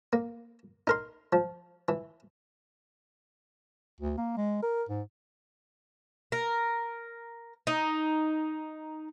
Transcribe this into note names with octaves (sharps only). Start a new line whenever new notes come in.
A#3
D#4 A#4 C6
F3
E3
D2
A#3
G#3
A#4
G#2
A#4
D#4